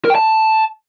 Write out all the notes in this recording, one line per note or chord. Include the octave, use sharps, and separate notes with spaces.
A#4
G5
A5